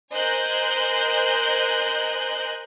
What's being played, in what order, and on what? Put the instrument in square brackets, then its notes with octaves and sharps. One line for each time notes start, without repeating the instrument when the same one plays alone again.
[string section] A#4 C5 D#5 G#5 F#6 G6